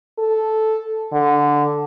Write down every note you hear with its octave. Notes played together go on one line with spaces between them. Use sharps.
A4
D3